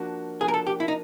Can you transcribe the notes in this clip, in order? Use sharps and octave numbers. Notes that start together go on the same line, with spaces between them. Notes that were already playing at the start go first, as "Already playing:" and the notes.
Already playing: F3 A#3 D4 F#4
F3 A#3 D4 F#4 G#4
A#4
A4
G4
E4
D#4